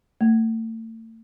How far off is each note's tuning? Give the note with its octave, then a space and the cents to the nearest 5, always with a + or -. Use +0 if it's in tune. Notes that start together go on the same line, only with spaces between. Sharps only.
A3 +40